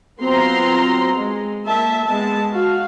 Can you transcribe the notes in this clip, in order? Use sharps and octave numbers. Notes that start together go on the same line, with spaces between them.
F#3 B3 C4 F4 A#5 C6
G#3
A#3 E5 A5
G#3 B3 A5
F#4 F5